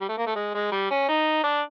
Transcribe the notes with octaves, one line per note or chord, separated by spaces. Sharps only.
G3
A3
A#3
A3
G#3
G#3
G3
C#4
D#4
D4